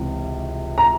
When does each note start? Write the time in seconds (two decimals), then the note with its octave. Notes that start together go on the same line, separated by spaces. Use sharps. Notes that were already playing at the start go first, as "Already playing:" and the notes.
Already playing: C#2 C3 E3
0.78 A#5